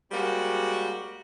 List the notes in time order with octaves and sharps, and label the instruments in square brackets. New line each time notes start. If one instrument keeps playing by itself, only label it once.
[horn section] G3 G#3 A#3 C4 F#4